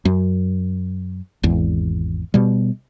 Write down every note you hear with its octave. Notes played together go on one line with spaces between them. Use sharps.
F#2
G#1 E2
B2 G3